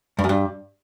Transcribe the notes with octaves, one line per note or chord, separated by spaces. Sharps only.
G2
F#2
G2